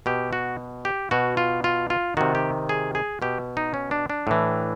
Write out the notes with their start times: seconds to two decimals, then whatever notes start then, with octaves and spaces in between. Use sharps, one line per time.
0.06 B2 G4
0.33 F#4
0.85 G4
1.11 B2 F#4
1.37 F4
1.64 F4
1.90 F4
2.17 C3 D#3 F#4
2.35 G4
2.69 G#4
2.95 G#4
3.22 B2 G4
3.57 D#4
3.74 C#4
3.91 D4
4.10 D4
4.27 A2 E3